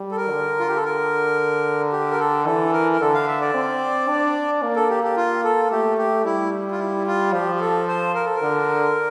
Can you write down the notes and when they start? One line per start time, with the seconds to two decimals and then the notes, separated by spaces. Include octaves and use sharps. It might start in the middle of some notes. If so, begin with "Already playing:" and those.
Already playing: G3
0.11 A4
0.17 A#4
0.30 D3
0.60 F4
0.68 G4
0.76 A4
0.84 A#4
1.92 G4
2.11 A#4
2.20 A4
2.46 E3 A4
2.73 A#4
2.92 A#4
3.01 D3 A4
3.14 F5
3.27 E5
3.41 D5
3.54 C4
4.08 D4
4.62 A#3
4.76 A4
4.90 G4
5.03 G4
5.17 F4
5.44 A4
5.71 A3 G4
5.98 G4
6.25 G3 E4
6.71 F4
6.79 E4
7.07 F4
7.33 F3 G4
7.55 G4
7.61 A4
7.87 C5
8.15 A#4
8.25 A4
8.36 A#4
8.42 D3